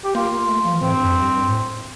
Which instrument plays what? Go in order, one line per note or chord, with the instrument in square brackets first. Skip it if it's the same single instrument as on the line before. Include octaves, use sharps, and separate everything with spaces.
[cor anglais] G4
[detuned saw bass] A#3 [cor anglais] F4
[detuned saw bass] A3
F3
E3
[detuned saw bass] A2 [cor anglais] C4
[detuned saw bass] G2
F2
G2
G2
A2